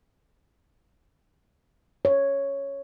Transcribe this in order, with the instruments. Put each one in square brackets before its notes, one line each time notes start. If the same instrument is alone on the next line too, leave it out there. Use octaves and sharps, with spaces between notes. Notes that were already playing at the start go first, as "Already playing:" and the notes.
[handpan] C#5